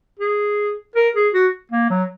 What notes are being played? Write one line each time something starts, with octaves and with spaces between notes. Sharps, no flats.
G#4
A#4
G#4
F#4
A#3
F#3